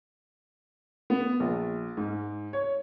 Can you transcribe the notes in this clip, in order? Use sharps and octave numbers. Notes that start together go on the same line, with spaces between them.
B3
A#1
G#2
C#5